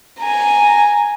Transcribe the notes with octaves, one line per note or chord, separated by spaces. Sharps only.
G#5 A#5